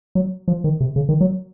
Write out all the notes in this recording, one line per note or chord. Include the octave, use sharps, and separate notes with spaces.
F#3
F3
D#3
C3
C#3
D#3
F#3